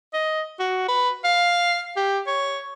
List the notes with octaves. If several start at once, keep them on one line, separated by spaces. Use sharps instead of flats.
D#5
F#4
B4
F5
G4
C#5